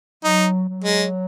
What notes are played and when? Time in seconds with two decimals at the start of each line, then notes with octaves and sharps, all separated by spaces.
0.24 F#3 D#4
0.69 F#3
0.84 G#3